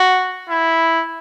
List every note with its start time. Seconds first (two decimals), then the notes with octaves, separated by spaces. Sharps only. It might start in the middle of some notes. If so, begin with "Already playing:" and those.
Already playing: F#4
0.49 E4